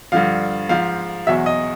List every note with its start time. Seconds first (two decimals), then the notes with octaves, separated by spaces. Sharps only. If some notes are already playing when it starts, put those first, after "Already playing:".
0.12 G2 D3 F3 F5
0.69 G#2 F3 F5
1.27 E2 B2 F#3 E5
1.46 D#5